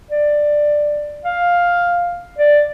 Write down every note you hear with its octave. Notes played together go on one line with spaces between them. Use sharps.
D5
F5
D5